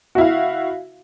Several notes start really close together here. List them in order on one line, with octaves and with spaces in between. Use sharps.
F#4 E4 F5